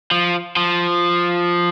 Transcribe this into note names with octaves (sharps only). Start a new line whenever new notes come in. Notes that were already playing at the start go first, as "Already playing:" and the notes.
F3
F3